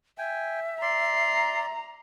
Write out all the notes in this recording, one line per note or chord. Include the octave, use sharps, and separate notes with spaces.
E5 G5 G#5
D5 A#5 C6 C7